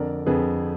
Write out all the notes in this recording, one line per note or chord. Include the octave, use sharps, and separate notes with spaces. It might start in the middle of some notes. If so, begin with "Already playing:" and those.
Already playing: F2 D3 A#4 D5
F2 D3 G#4 B4